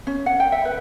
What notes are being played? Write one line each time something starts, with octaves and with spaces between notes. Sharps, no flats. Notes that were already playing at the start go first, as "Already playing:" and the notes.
C#4
F#5
G5
E5
B4